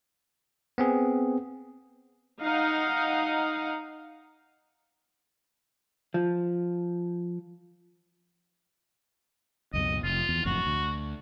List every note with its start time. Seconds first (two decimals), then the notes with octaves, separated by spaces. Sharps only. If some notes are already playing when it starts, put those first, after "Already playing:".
0.78 B3 C4 G#4
2.41 D#4 F5 F#5
6.14 F3
9.73 C#2 F#2 B2 D#5
10.04 F1 F4
10.29 E2
10.45 F#1 F2 A2 F#4
10.65 D2